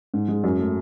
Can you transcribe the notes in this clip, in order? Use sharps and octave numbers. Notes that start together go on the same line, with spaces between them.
G#2
G#3
F#2
A3